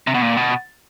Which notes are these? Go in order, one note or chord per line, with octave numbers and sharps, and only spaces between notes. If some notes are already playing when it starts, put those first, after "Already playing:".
C3
B2
A#2
B2